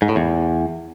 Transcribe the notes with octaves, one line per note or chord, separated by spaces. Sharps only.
G#2
A2
E2